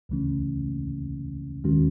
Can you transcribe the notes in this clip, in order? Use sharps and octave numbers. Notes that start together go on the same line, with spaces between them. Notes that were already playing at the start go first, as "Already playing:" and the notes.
C#2 C#3 E3 A3 C#4
D#2 D#3 G#3 C#4 F#4